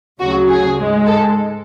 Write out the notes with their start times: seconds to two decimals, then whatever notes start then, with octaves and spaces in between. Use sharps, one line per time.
0.20 D2 C#3 F#3 F#4
0.49 G#4
0.78 G#2 G#3
1.06 A4